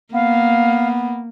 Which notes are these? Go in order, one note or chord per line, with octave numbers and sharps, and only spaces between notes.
A#3 B3 F5